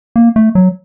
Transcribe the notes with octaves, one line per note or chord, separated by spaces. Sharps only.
A#3
A3
F#3